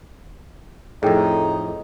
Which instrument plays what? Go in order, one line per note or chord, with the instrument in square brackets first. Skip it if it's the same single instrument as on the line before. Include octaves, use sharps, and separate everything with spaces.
[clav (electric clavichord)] F2 A2 [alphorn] D#4 [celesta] G#4 G5